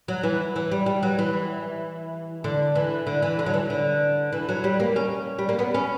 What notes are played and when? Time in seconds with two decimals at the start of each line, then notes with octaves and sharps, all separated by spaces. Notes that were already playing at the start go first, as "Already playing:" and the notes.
0.08 F#3
0.23 E3
0.56 E3
0.72 G3
0.86 G3
1.03 F#3
1.19 E3
2.44 D3
2.75 E3
3.07 D3
3.22 E3
3.39 D3
3.46 F#3
3.54 E3
3.70 D3
4.33 E3
4.49 F#3
4.64 G3
4.80 A#3
4.96 C#4
5.39 G3
5.49 A#3
5.59 B3
5.74 C#4